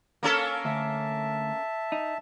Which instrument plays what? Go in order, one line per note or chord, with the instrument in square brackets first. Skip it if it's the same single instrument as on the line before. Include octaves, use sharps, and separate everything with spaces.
[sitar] A#3 C#4 A4
[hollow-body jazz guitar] D2 [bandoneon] E5 A5
[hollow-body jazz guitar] D#4